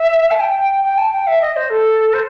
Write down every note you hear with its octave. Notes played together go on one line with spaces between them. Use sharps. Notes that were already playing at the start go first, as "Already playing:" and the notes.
Already playing: E5
A5
G5
G5
A5
G5
E5
D#5
C5
A4
C5